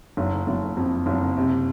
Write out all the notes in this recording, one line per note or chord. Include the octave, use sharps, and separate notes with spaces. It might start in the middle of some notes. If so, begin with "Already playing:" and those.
F#1
F#1
F2
F#1
C3